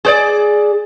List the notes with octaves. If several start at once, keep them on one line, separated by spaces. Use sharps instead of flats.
G#4 C5 D5